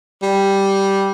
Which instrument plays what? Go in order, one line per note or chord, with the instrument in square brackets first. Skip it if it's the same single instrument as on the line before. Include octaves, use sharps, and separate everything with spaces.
[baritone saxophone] G3